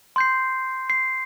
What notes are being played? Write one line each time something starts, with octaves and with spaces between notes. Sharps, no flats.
C6 G6 C7
C7